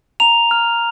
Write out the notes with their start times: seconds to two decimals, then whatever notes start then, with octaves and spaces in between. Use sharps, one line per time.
0.20 A#5 F7
0.51 F6